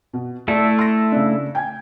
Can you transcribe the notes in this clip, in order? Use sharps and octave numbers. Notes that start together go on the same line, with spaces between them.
B2
A3 E4 A4 D5
C6 A#6
C#3 D4
G5 G#5 G#6